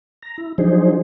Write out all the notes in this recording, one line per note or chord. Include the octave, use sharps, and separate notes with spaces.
A#5
E4
F3 F#3 D4 D#4 G#4 C5